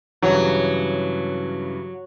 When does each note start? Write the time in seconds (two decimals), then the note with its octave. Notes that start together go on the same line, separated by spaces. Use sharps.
0.22 G2 C#3 E3 F#3